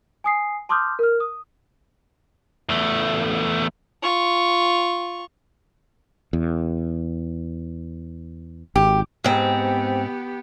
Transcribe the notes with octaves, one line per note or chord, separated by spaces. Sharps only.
G#5 D#6 C7
A5 C6 D6 D#6 F6 G6
A#4 F6
D#6
E2 A3
F4 C#6
E2
G#1 G4
G#2 B3 C4 G4